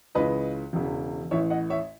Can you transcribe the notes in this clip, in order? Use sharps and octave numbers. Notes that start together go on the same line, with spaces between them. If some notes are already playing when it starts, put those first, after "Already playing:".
C#2 C#3 E3 B4 D#5
E1 E2 C#3
A1 A2 E3 C#5 E5
D#5 F#5
C#5 E5